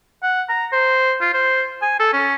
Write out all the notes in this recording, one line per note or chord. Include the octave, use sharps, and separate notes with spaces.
F#5
A#5
C5
F4
C5
G#5
A4
C#4